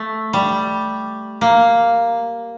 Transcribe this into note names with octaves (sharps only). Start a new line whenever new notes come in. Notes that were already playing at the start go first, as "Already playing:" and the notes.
Already playing: A3
G3
A#3